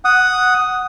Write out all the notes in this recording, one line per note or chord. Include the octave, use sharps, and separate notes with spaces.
F#5 D#6